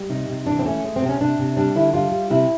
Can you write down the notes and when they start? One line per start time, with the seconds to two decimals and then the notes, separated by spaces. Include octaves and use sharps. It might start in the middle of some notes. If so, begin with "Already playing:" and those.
Already playing: G3
0.09 C3 D#4
0.29 C3
0.46 E3 D4
0.59 C4
0.66 A3 C#4
0.84 G#3
0.96 C4
1.02 C3
1.09 C#4
1.20 C3 D4
1.39 C3
1.57 G3 D4
1.75 D3 E4
1.94 G3 F4
2.12 G3
2.30 C3 E4